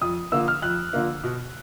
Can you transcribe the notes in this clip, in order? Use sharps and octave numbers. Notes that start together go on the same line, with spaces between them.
F2 D#6
D3 F3 A#3 E6
F6
F2 F#6
D3 F3 A#3
B2